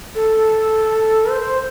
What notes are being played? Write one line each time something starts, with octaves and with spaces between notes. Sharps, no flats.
A4
C5